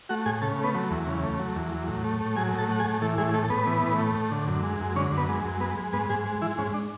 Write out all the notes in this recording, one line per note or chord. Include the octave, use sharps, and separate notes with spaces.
A3 F#4 F#5
A2 G#4 G#5
C#3 A4 A5
A3 B3 B4
F#3
E2
C#3
A3
F#3
E2
F#3
A2
A3
A2
F#3 G#4 G#5
A2
A4 A5
A3 F#5
G#4 G#5
A2
E3 A3 A4
A2 G#3 G#4
G#4
A3 A4
A4
A2 B3 B4
E3
A2
A3
A2
D3
F#2
G#3
F#2
D3 C#4 C#5
F#2
B3 B4
G#3
F#2
G#3 B3 B4
G#3
G#2 B3 B4
G#2 G#3 G#4
G#3
E3 G#3 E4
G#2 C#4
D4